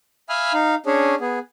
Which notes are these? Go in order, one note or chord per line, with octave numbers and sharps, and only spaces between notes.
E5 F5 G#5 B5 D#6 F6
D#4 F5
C#4 D4 G#4 C#5
B3 G#4